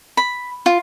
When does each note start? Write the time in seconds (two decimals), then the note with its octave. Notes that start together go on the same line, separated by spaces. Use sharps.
0.17 B5
0.66 F4